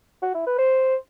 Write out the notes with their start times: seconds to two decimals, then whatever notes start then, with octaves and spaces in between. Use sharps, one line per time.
0.22 F#4
0.34 E4
0.46 B4
0.58 C5